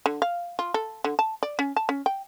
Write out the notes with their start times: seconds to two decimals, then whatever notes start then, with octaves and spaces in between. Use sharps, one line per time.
0.06 D3
0.22 F5
0.59 F4
0.74 A4
1.04 D3
1.19 A5
1.43 D5
1.59 C#4
1.76 A5
1.89 C#4
2.06 G5